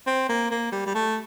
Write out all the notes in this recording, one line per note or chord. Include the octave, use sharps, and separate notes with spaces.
C4
A#3
A#3
G3
G3
A3